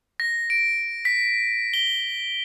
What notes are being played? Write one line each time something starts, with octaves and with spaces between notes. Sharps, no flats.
A#6
D7
B6
G7